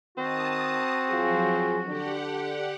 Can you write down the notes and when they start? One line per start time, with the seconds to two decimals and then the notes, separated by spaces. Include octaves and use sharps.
0.18 D#3 C4 F#4 A5 D#6
1.09 F3 F#3 F4 G#4
1.86 D3 G4 F#5